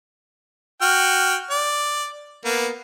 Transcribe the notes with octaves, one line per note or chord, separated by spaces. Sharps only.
F#4 G5 F6
D5
A#3 B3